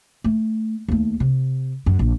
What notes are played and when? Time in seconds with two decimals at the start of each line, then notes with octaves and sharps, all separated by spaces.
0.24 A3
0.88 D#2 A3
1.20 C3
1.86 F#2
1.99 A#1